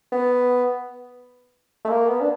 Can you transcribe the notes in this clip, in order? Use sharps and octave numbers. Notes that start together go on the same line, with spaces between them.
B3
A3
A#3
B3
D4